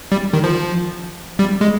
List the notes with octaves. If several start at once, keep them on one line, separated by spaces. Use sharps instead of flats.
G3
D#3
F3
G3
G#3